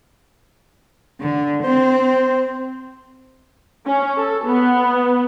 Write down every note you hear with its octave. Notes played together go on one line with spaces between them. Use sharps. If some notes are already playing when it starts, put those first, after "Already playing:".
D3
C4 C5
C#4
A4
B3